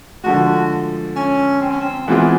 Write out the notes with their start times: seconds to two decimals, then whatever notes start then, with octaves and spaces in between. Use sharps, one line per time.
0.24 D3 F3 G#3 F#4
1.16 C#4
1.61 C4
1.71 C#4
1.80 C4
2.07 E3 G#3 B3 C4 F4 G#4